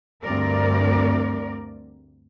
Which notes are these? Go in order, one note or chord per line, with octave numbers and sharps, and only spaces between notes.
D2 G2 C4 A#4 D5